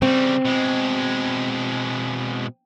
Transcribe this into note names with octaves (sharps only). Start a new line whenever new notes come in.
C#3 G3 C4
B2 G#3